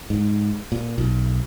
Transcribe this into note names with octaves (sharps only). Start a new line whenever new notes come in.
G#2
A#2
B1